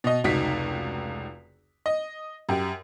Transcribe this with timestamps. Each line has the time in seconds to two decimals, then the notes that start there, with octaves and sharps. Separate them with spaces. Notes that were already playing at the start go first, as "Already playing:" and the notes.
0.04 B2 D#5
0.24 F1 C#2 D#4 F#4 B6
1.86 D#5
2.49 F#2 G4